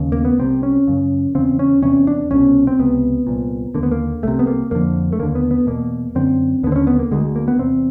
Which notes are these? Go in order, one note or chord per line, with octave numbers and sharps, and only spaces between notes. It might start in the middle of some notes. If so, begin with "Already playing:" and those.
Already playing: D#2 C#3
A#3
B3
C2 C3 C4
C#4
F#2 C#3
E2 C#3 C4
C#4
E2 C3 C#4
D4
C2 B2 C#4
C4
C#2 C3 B3
C2 A#2
D#2 D3 A#3
B3
A#3
C2 C3 A3
B3
A#3
F2 D3 A#3
A3
D#2 D3 A#3
B3
B3
E2 B2 A#3
F#2 D3 C4
D#2 D3 B3
C4
C#4
B3
A#3
D2 D3 G#3
A#3
B3
E2 C3 C4